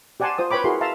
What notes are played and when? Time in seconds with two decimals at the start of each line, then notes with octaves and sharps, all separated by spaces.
0.20 G4 D5 F#5 G#5 A5 C6
0.38 F4 C5 D#6
0.51 B4 C#5 G5 B5 D6
0.64 E4 F#4 G#4 A#4 C6
0.81 E5 F5 A5 A#5 C6